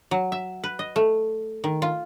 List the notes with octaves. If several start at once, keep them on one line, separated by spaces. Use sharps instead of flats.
F#3
E5
B4
D#5
A3
D#3
F4